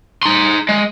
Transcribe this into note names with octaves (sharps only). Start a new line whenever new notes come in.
D#4 C6
G#3